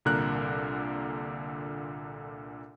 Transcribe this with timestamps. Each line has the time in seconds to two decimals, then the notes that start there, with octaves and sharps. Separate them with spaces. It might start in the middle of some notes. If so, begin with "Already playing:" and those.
0.05 C2 A#2 D3 A#4 F#6